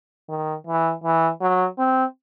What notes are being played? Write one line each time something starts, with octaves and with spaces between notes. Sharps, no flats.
D#3
E3
E3
F#3
C4